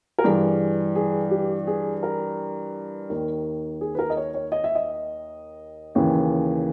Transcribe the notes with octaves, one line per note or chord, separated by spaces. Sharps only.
A#4
G2 E3 G#4
G#4
G4
G#4
A#4
D#2 D#3
G#4
B4
A#4
D#5
C#5
C#5
D#5
E5
D#5
D#2 C#3 E3